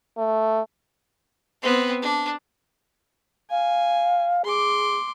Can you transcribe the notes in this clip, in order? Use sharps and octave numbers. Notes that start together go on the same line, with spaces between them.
A3
B3 C4
D4
F5 G#5
G#4 C6 D6